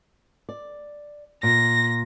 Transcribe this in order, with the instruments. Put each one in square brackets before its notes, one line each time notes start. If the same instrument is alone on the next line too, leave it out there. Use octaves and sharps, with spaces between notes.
[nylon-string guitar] D5
[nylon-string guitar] A#2 [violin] A#6